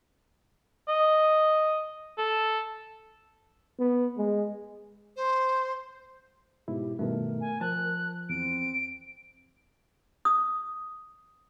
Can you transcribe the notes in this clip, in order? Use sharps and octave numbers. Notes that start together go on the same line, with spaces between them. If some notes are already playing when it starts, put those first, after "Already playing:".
D#5
A4
B3
G#3
C5
G#2 B2 E4 G4
G2 B2 D#3 A3 A#4
G#5
F3 A5 F#6
E2 C4 D7
D#6